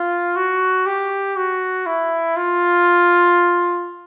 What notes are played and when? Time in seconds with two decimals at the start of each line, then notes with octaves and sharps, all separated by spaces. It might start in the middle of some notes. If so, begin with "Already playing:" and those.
Already playing: F4
0.36 F#4
0.86 G4
1.36 F#4
1.86 E4
2.36 F4